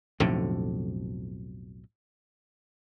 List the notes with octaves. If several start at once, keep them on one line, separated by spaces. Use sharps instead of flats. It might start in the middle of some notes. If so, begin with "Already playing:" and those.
B1 F2 A2 D3